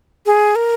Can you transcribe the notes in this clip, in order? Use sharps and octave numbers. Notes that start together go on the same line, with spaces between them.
G#4
A#4